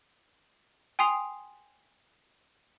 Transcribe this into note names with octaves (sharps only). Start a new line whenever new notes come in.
G5 G#5 C6 D#6 C7 F7